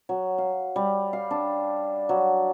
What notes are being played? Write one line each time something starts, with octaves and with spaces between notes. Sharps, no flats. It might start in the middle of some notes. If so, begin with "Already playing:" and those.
F#3
F5
G3
F5
D4
F#3